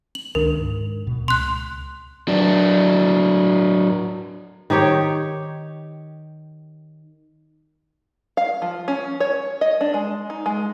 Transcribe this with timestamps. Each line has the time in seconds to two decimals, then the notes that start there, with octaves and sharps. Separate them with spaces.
0.15 F#7
0.35 C#2 D#3 D4 A#4
0.59 G#2
1.07 D1 B2
1.28 C#2 C6 F#6
2.28 F#3 D4
4.70 D#3 D#4 G4 C#5
8.37 F5
8.62 F3
8.88 C#4
9.20 C#5
9.61 D#5
9.81 D4
9.94 G#3
10.30 D#4
10.46 G#3